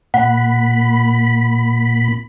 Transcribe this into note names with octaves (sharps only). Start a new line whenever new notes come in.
A#2 F#5 B5